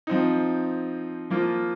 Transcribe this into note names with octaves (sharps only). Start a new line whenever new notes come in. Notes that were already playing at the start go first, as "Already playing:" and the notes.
F3 C4 D#4
F3 A#3 F4